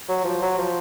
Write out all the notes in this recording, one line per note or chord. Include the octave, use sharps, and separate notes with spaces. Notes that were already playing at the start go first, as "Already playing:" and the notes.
F#3
F3
F#3
F3